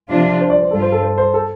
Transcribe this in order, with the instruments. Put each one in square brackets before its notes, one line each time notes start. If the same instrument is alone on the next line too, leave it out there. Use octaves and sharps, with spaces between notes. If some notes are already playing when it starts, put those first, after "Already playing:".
[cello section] C3 F3 D4 F4
[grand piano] C5
D5
C5
[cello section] G2 G3 F4 [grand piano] A4
[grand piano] C5
A4
C5
C5
A4